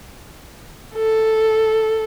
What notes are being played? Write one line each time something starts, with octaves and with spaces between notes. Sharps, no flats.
A4